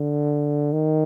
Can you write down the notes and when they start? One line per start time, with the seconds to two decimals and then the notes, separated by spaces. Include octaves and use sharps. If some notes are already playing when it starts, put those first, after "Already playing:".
Already playing: D3
0.72 D#3